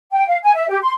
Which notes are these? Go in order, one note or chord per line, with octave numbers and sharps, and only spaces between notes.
G5
F5
G#5
E5
G4
C6